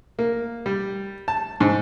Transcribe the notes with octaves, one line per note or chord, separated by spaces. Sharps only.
A#3
G3
A5
G#2